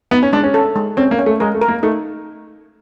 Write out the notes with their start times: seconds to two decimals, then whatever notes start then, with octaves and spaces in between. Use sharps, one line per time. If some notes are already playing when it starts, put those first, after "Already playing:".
0.11 B3 D#4
0.23 C#4
0.33 G#3 D4
0.44 C#4
0.54 A4
0.76 G#3
0.97 C4 C#4
1.11 A#3
1.19 C#4
1.26 A3
1.40 G#3 A#4
1.54 A3
1.62 A#4
1.68 A#3
1.83 A3 D#4